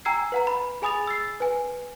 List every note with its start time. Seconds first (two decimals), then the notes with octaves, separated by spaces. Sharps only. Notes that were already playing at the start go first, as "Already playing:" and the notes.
0.05 G5 G#5 A#5 E6 G#6 C7
0.32 B4 F#5 A#5
0.47 B5
0.82 G#4 G#5 B5 D#6 A6 F7
1.07 E6 A6 C7
1.40 B4 G#5